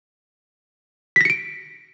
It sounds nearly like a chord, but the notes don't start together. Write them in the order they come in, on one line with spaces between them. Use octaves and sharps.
B6 A#6 C#7 D7